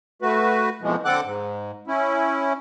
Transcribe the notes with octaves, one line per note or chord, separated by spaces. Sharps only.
A3 F#4 B4
F2 B2 E3 F3 G#3
D3 C4 A4 F#5 D6 F#6
G#2
C#4 E4